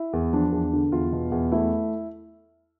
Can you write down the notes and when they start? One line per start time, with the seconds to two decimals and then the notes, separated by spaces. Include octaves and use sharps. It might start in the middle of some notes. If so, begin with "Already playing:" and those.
Already playing: E4
0.13 E2
0.33 F3 D4
0.52 E2
0.73 D3
0.92 E2 F4
1.13 B2
1.32 E2
1.52 A3 E4